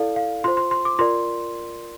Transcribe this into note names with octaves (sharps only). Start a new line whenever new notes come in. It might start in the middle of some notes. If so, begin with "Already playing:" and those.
Already playing: E4 A4 D5 F5
F5
F4 C5 C6
C6
C6
D6
F4 A#4 D5 C6